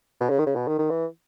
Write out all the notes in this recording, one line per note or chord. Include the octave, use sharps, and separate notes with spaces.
B2
C#3
D#3
C#3
B2
D#3
D#3
E3